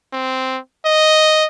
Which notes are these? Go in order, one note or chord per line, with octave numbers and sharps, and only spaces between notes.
C4
D#5